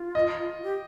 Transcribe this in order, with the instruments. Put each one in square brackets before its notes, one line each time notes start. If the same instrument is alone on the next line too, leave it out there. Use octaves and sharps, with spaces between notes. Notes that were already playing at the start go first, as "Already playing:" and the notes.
Already playing: [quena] F4
[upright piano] D#5
[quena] G4